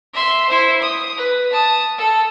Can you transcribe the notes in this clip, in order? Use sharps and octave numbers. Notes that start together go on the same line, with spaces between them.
E5 C6
E4 C5
D#6
B4
A5 D#6
A4